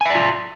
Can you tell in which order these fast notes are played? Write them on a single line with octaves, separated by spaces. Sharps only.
G#5 E5 D5 F4